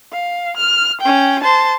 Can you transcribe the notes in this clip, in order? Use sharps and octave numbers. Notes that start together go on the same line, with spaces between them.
F5
F6
C#4 G5
C5 A5